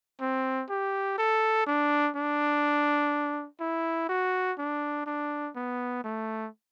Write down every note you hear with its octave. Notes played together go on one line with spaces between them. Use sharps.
C4
G4
A4
D4
D4
E4
F#4
D4
D4
B3
A3